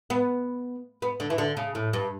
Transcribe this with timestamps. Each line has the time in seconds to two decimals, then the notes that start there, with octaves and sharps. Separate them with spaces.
0.10 B3
1.02 B3
1.20 D3
1.30 E3
1.38 D3
1.57 C#3
1.75 A2
1.93 G2